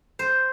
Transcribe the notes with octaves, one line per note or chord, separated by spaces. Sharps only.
C5